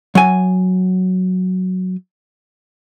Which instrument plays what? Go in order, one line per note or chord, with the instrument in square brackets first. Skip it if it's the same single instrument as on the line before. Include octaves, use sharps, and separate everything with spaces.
[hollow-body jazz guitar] F#3 G#5